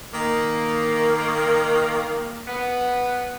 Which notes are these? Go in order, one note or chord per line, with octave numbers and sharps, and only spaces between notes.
D#3 A#3
B3